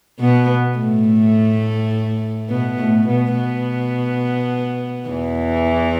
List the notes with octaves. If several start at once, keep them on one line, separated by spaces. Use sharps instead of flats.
B2 B3
A2 A3
B2 B3
A2 A3
B2 B3
B2 B3
E2 E3